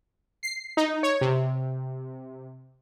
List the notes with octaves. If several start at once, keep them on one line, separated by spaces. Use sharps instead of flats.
C7
D#4
C#5
C3